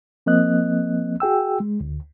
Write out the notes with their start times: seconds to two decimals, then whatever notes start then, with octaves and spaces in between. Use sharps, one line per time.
0.26 F3 A#3 C4 D#5 F#6
1.20 F#4 G#4 G5 E6
1.60 G#3
1.81 D2